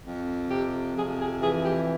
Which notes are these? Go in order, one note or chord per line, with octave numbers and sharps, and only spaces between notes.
F2
C3 G4
F2 G#4
G#4
E3 G#4
G4